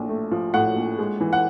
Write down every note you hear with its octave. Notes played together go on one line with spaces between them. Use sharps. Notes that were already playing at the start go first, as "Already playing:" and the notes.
Already playing: A#1 A2 F3
A3
F3
A2 F#5
A#1
G#3
E3
F#5